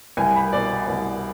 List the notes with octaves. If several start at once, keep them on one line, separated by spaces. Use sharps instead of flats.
C2 G#5
B5
B2 D5
C2